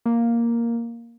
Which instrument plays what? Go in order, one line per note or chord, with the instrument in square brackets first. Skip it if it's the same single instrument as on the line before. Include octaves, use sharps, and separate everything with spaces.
[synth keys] A#3